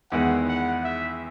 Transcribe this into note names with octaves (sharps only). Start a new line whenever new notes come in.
E2 D#3 G#3 B3 E4 F#5
F#5
E5